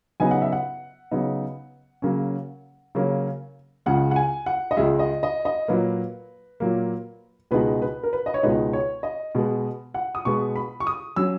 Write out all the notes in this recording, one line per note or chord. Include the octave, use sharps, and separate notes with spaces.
C#3 F#3 B3 D#4 G#5
F#5
E5
F#5
C#3 F#3 B3 D#4
C#3 F#3 A#3 C#4
C#3 F#3 A#3 C#4
C#2 C#3 G#3 F#5
F#5
G#5
F#5
D#5
C#2 C#3 G#3 E5
D#5
D#5
D#5
A#2 F#3 A#3 B4
A#2 F#3 A#3
C#2 B2 G#3 D#4 B4
B4
A#4
B4
D#5
C#5
C#2 B2 G#3 D#4 B4
C#5
D#5
B2 G#3 B3
F#5
D#6
B2 G#3 B3 C#6
B5
C#6
D#6
F#3 C#4 E6